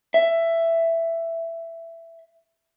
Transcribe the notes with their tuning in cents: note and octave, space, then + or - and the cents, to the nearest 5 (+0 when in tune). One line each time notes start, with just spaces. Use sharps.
E5 +10